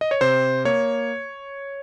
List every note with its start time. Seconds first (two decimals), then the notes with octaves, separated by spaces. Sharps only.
0.01 D#5
0.11 C#5
0.21 C3 C5
0.65 A#3 C#5